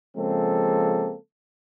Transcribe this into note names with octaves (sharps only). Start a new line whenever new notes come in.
C#3 F3 G#3 A#3 C4 A4